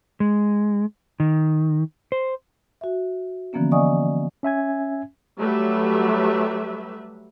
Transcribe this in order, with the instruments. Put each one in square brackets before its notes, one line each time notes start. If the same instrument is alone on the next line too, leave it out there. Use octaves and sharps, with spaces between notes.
[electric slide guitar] G#3
D#3
C5
[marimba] F#4 E5
D3 E3 F3 A#3 B3 C#4
D5 D#5 F5 G#5 C#6 D#6
[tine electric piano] C#4 E5 G#5 G#6
[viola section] F#3 G3 A3 B4 E5